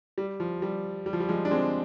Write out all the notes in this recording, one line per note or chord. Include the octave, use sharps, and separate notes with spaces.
G3
F3
G3
G3
F3
G3
F3 G#3
D4
G#3 C4